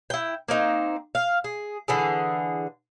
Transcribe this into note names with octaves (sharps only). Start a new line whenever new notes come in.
E4 G5
A#3 C4 D#4
F5
G#4
D3 E3 G#4